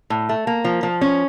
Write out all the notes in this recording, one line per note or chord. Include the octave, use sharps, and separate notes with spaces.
A2
A3
A#3
F3
F3
C#4